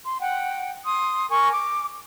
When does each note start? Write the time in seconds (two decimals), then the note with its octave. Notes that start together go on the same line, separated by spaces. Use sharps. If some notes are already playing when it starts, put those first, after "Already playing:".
0.04 C6
0.20 F#5 G5
0.84 C6 D#6
1.30 A#4 G#5 C#6
1.52 D6